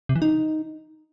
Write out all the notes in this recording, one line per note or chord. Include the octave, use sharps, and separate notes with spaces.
C3
E3
D#4